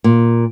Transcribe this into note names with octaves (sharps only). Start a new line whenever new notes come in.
A#2